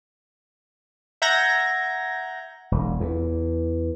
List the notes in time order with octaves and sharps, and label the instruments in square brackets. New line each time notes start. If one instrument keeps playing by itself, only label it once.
[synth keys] E5 F#5 A#5 G6 G#6 A#6
[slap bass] E1
E2